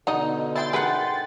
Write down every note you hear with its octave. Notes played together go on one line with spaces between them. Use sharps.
B2 D3 D#4 D5 D#5 F#5
E3 E4 G5 C6 A6
G#4 A#4 B4 F#5 B5